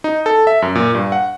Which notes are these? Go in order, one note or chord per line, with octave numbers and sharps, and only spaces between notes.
D#4
A4
E5
F#2
A#2
G2
F#5